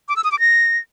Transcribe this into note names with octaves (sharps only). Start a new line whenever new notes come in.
D6
E6
D#6
D6
A#6